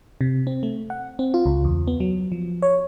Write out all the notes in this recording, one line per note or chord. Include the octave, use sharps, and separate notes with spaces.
C3
C4
A3
F#5
C4
F4
C#2
E2
B3
F#3
F3
C#5